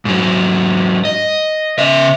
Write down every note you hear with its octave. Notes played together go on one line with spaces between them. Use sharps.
G#2 F#3
D#5
C#3 E5